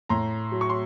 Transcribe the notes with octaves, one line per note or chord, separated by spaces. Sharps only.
A2 A#5 C6
F#3
C#6
C6